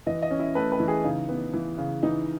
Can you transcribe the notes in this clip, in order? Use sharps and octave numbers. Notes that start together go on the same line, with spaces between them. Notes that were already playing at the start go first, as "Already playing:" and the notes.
E3 D#5
D#5
C#4
E4
A3 B4
B4
E3
G#4
C#3 D#4
B3
E3
C#3
E3 D#4